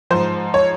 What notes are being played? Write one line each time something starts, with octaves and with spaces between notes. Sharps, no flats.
G#2 F3 C5
C#5